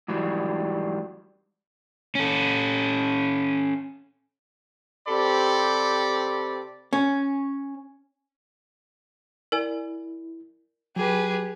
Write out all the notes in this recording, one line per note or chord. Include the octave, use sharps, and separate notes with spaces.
G#2 E3 F#3 G3
C#4 A4
C3 C4 G4 A4 D5 B5
C#4
E4 A#4 D5 G#5
F#3 G4 G#4 B4